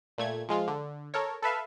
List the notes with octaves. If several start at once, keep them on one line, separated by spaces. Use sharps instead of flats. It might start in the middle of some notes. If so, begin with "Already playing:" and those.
A#2 A3 G#6
F3 G#3 F4
D3
A4 A#4 C#5
A4 B4 E5 F5